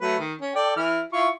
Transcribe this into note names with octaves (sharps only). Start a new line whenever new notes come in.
F#3 A3 B4
D#3
C#4
A4 D5 G5
E3 E4 F6
E4 F4 C#6